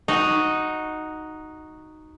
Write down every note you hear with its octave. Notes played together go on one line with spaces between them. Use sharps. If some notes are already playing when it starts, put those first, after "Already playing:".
D#4 F#4